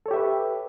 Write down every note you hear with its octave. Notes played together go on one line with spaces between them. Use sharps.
G4 A4 B4 C#5 E5